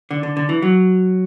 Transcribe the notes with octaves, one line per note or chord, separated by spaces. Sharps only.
D3
D3
D3
E3
F#3